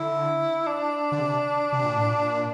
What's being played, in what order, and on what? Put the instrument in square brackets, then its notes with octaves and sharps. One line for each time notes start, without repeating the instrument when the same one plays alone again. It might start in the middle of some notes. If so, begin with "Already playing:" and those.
Already playing: [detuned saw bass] D3 [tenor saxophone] E4
[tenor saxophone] D4
[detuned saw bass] D3
C3
C3
A#2
A2
A#2